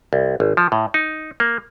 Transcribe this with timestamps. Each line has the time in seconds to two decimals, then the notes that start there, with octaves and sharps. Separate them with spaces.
0.13 C2
0.40 G#1
0.57 F3
0.72 A2
0.94 D#4
1.40 A#3